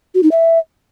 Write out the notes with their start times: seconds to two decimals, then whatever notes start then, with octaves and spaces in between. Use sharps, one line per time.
0.14 F#4
0.23 D#4
0.31 E5